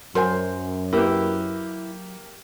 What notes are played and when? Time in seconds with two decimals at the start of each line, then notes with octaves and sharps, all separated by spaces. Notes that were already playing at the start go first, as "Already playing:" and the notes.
0.15 F#2 F#3 A#4 C5 G#5 C6
0.93 A#3 E4 G4 B4